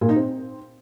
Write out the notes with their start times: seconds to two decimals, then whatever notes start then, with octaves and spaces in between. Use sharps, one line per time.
0.01 A#2
0.09 D#4
0.16 C4